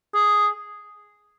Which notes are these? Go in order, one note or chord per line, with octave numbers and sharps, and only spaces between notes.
G#4